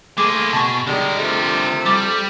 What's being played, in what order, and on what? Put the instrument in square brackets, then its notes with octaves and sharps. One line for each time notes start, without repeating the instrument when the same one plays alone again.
[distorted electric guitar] A3 A#3 [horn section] G#4 C6 [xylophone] D6
[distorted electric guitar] B2 [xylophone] A5 C#6
[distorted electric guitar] D3 A#4 [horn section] G3 G#3
[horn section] C3 F3 A3
[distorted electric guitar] G3 [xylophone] D6 A6